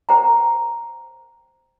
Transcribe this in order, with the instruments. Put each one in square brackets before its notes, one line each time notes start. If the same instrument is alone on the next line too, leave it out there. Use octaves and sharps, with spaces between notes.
[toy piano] C5 G5 A#5